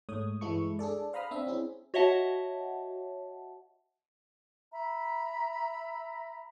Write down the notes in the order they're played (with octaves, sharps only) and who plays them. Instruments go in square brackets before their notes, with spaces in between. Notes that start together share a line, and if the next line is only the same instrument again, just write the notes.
[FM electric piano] G#2 A3 C#5 D#6
G2 E3 G#3 E4 A4 C#6
D4 G#4 A4 D5
C5 F5 A#5 B5 D#6 F6
C4 D4 E5
C4 C#4 E4 G#4
[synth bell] F#4 C#5 D#5 E5 F#5 A5
[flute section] E5 A#5 B5